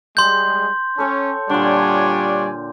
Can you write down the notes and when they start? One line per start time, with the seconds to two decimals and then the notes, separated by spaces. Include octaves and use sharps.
0.17 G3 G#3 C6 G6
0.98 C#4 A4 C#5 G5
1.50 A#2 D3 G3 D4 F4 C#5 D5 G#5